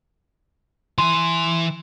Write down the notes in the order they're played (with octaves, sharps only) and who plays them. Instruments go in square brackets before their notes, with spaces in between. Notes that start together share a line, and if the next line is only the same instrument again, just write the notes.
[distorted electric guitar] E3 G#5 [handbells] C6